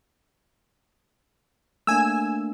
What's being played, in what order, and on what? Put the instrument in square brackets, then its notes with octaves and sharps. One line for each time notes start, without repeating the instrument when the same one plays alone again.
[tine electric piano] A3 A#3 D4 [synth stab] G#5 E6